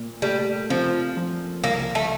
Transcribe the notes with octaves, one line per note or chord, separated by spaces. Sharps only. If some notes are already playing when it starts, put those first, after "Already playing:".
Already playing: A#2
G3 A3
F3 C4
F3
C2 A#3
A3